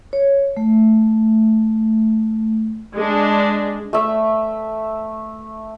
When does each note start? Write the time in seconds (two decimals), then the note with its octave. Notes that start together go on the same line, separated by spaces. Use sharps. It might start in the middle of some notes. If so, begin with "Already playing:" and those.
0.13 C#5
0.57 A3
2.94 G#3 D4
3.93 A3 E5